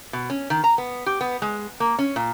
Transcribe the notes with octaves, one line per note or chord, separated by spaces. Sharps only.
B2
C#4
D#3
A#5
B3
G4
B3
G#3
A#3
C#4
A#2